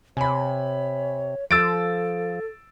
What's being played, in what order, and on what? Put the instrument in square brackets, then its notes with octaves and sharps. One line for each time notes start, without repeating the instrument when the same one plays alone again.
[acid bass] C3 [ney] C#5 [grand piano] G#5 B5
[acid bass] F3 [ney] A4 [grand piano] E6 A6 D7